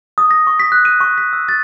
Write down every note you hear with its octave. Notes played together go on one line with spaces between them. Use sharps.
D#6
A#6
C#6
B6
F#6
D#7
C#6
B6
E6
A6